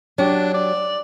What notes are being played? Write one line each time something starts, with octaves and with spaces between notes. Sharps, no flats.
F#3 D4 G4
D5